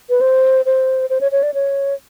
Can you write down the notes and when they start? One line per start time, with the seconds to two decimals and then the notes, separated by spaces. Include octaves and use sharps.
0.10 B4
0.21 C5
0.66 C5
1.10 C5
1.21 C#5
1.32 C#5
1.43 D5
1.54 C#5